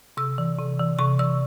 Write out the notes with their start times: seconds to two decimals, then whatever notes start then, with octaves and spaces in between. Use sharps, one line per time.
0.17 C3 E6
0.38 E3
0.58 C3
0.79 E3
0.99 C3 C#6
1.19 E3 E6